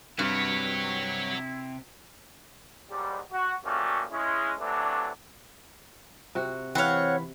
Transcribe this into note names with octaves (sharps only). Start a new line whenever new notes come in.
G2 C3 E4 F#4 C#5
D#2 G#2 F#3 G3
F#4
F3 G3 A3 A#3 C#4 F#4
G#3 C#4 E4
C3 E3 F#3 A3 D4
C3 F#4
E3 C4 C#5 F5 F#5 B5